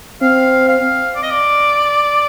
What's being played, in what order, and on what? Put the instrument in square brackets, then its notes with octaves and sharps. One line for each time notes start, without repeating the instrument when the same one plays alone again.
[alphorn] C4 [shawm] F5
[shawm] F5
D5
D#5
D5